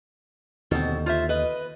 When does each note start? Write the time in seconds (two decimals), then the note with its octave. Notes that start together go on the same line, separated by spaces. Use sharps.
0.71 D#2 B2 D3 C4
1.06 F4 C5 E5
1.29 B4 D#5